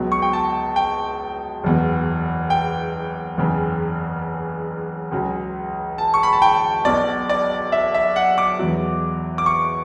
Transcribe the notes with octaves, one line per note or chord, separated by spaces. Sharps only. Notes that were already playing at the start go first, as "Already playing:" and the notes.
Already playing: C#2 B2 F#3
C#6
G5
A5
G5
F#1 E2 B2
G5
F#1 E2 C#3
C#2 C#3 F#3
A5
C#6
B5
A5
G5
B1 B2 F#3 D5
D5
E5
E5
F#5
D6
E2 B2 F#3
D6
C#6